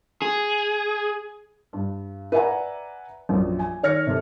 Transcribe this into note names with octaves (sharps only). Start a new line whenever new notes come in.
G#4
G2
B4 D5 E5 F#5 G#5 A#5
A#1 F#2
G#5
D#3 C#5 F6 A#6 C#7
C3 A4